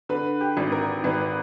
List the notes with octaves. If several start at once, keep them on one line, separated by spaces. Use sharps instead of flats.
D3 B4
G4
G#1
A#4
G#1 B4